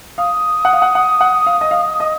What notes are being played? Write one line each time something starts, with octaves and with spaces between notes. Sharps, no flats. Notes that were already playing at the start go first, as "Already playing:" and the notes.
F5 D#6
F#5
F5
F#5
F#5
F#5
F5
D#5
F5
D#5